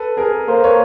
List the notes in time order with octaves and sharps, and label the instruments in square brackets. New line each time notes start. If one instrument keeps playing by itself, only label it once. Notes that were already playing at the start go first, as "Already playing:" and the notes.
Already playing: [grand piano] A4 B4
G#4 A#4
[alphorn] A#3 [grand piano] A#4 C5
[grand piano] B4 C#5